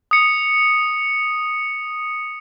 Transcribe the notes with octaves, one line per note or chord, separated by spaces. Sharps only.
D#6 C#7